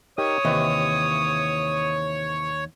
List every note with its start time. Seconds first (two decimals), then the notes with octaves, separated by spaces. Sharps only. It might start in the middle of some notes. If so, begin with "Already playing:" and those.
0.18 D#4 G4 A#4 C#5 D#6
0.45 D#2 C3 E3